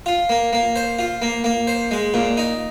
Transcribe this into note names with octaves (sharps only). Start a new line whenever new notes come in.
F4
A#3
A#3
C5
F4
A#3
A#3
C5
G#3
A#2
D#4